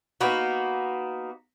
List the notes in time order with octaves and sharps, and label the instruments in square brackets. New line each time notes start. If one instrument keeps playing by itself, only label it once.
[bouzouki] A#3 B3 D#4 F#4